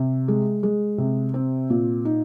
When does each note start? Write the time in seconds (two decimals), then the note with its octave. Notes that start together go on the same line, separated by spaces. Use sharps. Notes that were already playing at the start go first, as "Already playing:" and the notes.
Already playing: C3
0.28 G#3
0.63 G#3
0.98 C3
1.34 C4
1.70 A#2
2.05 D#4